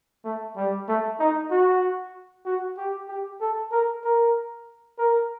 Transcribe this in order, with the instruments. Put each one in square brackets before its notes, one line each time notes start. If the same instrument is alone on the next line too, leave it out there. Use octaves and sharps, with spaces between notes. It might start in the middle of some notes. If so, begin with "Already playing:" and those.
[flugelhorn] A3
G3
A3
D#4
F#4
F#4
G4
G4
A4
A#4
A#4
A#4